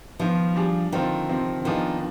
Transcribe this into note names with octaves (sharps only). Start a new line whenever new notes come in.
D#3 F3 B3 F4 C5
G3 D4 G#4
D3 D#3 F3 C4 F4
C3 F3 C4
D#3 F3 B3 D4 F4 G#4